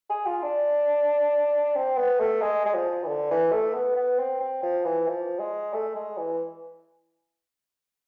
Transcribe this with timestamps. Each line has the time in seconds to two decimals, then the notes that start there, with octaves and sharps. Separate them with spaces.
0.10 G#4
0.26 F4
0.43 D4
1.75 C4
1.97 B3
2.20 A3
2.41 G#3
2.65 G#3
2.75 F3
3.04 E3
3.08 D3
3.31 E3
3.53 A3
3.75 B3
3.96 B3
4.19 C4
4.41 C4
4.63 F3
4.85 E3
5.08 F3
5.40 G#3
5.74 A3
5.95 G#3
6.18 E3